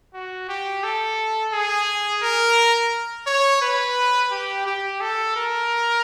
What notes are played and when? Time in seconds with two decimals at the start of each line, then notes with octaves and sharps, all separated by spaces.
0.14 F#4
0.49 G4
0.83 A4
1.53 G#4
2.23 A#4
3.27 C#5
3.62 B4
4.31 G4
4.66 G4
5.01 A4
5.36 A#4